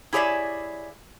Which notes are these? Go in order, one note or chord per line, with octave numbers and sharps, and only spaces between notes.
E4 G4 G#4 C#5 D5 E5